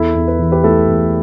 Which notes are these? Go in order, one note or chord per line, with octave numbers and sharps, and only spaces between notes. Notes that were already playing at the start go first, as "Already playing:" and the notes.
Already playing: E2 E4 A4
E2
B4
E3
G4 B4
A3 E4 A4
E2